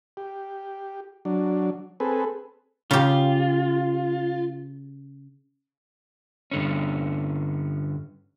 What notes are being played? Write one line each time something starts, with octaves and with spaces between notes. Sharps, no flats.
G4
F#3 D4
C4 G#4 A4 B4
C#3 F4 G4
G2 D3 C#4